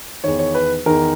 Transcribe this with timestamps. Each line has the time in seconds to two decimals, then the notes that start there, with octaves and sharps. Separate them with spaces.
0.24 E2 D#3 C#5
0.39 C#5
0.55 B4
0.86 E2 D#3 A#4